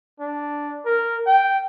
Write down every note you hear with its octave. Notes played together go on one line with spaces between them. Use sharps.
D4
A#4
G5